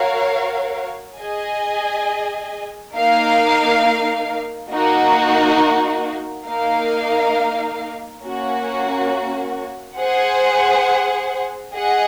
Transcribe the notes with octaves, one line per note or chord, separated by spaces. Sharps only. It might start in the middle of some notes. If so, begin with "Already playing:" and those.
Already playing: F#4 A#4 C#5 F5
G#4 D#5 G#5
A#3 D#4 A#4 F5
A#3 D#4 F#4
A#3 D#4 A#4 F5
A#3 C#4 F#4
G#4 C5 F#5
G#4 D#5 F#5